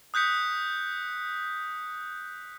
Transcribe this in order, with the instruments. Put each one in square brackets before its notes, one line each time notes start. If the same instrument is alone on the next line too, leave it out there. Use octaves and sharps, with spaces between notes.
[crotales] D#6 F#6 G6 B6 C#7